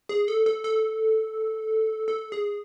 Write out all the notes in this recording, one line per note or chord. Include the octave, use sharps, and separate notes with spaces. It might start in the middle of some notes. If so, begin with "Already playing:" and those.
G#4
A4
A4
A4
A4
G#4